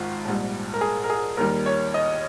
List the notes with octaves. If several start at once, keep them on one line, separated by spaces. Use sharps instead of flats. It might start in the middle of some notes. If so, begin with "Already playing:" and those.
Already playing: G#1 G#2 D#3 F4
A#1 G#2 G3
A#4
G#4
A#4
G#4
D#2 D#3 G3 A#4
C#5
D#5